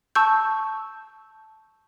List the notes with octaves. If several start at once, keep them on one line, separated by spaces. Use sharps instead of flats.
A5 C#6 E6 G6